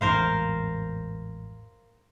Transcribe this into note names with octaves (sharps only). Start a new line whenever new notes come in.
A1 E2 G#2 A#4 C5 F5